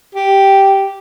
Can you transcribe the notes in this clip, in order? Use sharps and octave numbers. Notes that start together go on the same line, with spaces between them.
G4